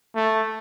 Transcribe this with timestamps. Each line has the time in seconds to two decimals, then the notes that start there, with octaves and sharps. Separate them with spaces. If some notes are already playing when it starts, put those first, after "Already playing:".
0.16 A3